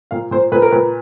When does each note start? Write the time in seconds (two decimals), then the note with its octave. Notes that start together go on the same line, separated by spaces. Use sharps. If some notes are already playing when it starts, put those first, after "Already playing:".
0.11 A#2 F5
0.31 A#2 C5
0.52 A#2 B4
0.62 A#4
0.71 A#2 B4